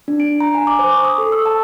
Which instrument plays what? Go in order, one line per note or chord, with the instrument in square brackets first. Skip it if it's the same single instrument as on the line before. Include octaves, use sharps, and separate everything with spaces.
[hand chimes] D4
D7
A#5
G#5
D6
C5
C#6
D#6
A4
E6
A5